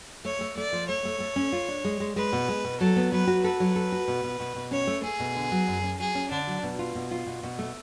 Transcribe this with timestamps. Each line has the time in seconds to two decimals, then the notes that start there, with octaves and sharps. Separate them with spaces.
0.25 A3 C#5
0.41 A3
0.57 A3 D5
0.73 F3
0.88 A3 C#5
1.05 A3
1.20 A3
1.36 C#4
1.52 F4
1.68 D4
1.85 G#3
2.00 G#3
2.16 G#3 B4
2.33 B2
2.48 G#3
2.64 B2
2.80 F#3 A4
2.96 B3
3.12 F#3 B4
3.27 F#4
3.44 A4 B4
3.60 F#3
3.76 A4
3.92 F#4
4.08 B2
4.24 B2
4.40 B2
4.56 B2
4.71 C#4 C#5
4.87 A3
5.03 A3 G#4
5.20 B2
5.35 D3
5.52 F#3
5.68 F#2
5.84 C#4
5.99 F#3 G#4
6.15 C#4
6.31 D3 D4
6.47 F#3
6.63 B2
6.79 F4
6.95 B2
7.11 F4
7.27 B2
7.43 B2
7.59 A3